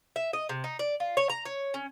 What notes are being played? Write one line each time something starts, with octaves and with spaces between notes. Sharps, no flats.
E5
D#5
C3
D#4
D5
F4
C#5
A#5
C#5
C#4